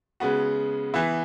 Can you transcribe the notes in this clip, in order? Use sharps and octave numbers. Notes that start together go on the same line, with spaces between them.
C#3 G#3 B3 F#4
E3 B3 E4